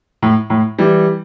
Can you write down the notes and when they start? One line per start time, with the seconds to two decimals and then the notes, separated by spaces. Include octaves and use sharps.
0.22 A2
0.50 A2
0.78 E3 G3